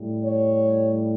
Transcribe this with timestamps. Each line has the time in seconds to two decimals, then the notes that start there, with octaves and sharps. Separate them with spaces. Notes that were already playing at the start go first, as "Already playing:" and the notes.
Already playing: A2 G3
0.23 C#5